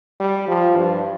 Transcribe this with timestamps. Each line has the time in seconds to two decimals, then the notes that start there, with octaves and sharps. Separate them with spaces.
0.20 G3
0.48 F3
0.77 G2